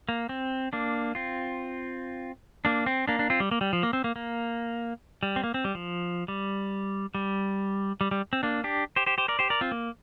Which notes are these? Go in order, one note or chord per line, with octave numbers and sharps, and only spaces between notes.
A#3
C4
A#3 D4
C4 F4
A#3 D4
C4
A#3 D4
D4
C4 F4
G3
A#3
G3
F3
A#3
C4
A#3
A#3
G3
C4
A#3
C4
G3
F3
G3
G3
G3
G3
C4
A#3 D4
D4 G4
G4 C5
G4 C5
G4 C5
A#4 D5
G4 C5
A#4 D5
C4 F4
A#3